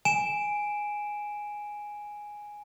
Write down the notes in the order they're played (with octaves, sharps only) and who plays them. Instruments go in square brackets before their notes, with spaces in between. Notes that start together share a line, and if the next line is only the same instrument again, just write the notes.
[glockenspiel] G#5 D7 E7